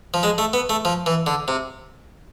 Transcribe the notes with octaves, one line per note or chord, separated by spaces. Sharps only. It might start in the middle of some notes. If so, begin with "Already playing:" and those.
F3
G#3
A3
B3
A3
F3
E3
D3
C3